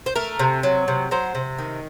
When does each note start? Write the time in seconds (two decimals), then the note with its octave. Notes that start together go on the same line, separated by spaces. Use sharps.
0.06 C5
0.16 A3 A#4
0.39 C3
0.63 F#3
0.88 C3
1.11 F#3 C5
1.35 C3
1.58 D#3